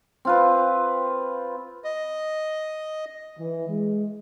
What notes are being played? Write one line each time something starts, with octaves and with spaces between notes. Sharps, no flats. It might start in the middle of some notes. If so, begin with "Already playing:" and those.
C4 F4 B4
D#5
E3
G#3